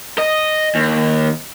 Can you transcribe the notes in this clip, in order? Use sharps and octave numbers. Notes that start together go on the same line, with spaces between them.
D#5
D#2